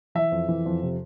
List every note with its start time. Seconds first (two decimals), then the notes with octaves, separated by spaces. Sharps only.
0.15 E3 E5
0.32 F2
0.48 E3
0.66 F2
0.82 C3